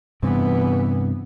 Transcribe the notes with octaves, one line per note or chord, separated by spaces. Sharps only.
G2 C3 E3 B3